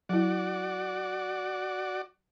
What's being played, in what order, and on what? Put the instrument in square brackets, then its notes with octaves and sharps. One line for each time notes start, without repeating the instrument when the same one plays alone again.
[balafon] F#3 E4 [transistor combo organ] F#4 D5